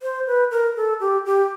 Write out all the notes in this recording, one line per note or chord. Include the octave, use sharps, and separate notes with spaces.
C5
B4
A#4
A4
G4
G4